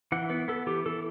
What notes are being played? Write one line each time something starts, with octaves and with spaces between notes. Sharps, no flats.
E3 F#5
B3 B4
B3 A4
E3 G4
E3 A4